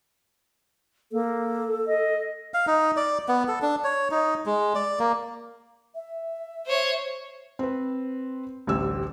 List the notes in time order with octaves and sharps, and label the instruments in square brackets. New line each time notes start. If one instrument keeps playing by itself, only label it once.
[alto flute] A#3 [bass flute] A4
[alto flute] D#5
[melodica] F5
D#4
D5
B3
A4
D4
C#5
D#4
G#3
D5
A#3
[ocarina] E5
[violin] C5 C#5
[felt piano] C4 B4
A1 D2 G3 E6